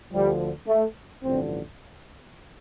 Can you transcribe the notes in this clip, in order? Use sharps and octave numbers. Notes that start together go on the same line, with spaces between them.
D2 D3 F3 G3
A3
A1 G2 D3 F3 C4